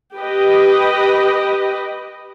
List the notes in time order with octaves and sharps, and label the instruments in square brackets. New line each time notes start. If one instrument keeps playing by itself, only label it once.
[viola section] G4 B4 D#5